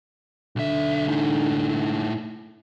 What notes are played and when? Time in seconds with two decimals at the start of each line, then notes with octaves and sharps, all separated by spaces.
0.56 B1 D3 E5
1.08 A2 D#4